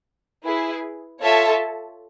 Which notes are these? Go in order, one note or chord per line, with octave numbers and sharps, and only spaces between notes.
E4 G#4 B4
F4 A4 C#5 E5 A5